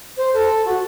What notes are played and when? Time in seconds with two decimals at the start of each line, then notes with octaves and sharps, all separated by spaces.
0.17 C5
0.33 A4
0.65 F#4